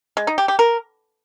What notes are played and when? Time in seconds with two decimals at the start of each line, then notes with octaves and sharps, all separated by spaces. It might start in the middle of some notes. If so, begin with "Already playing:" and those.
0.17 G#3
0.27 D#4
0.38 G4
0.48 G4
0.59 A#4